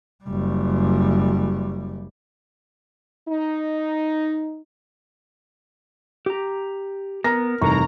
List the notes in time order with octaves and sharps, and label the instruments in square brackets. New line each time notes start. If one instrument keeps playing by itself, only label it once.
[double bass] F#1 G3
[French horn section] D#4
[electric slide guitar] G4 A#5
[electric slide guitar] B3 [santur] A#4 [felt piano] A#6
[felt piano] F1 [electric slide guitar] G2 E3 G3 [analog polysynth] A#5 [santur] C#6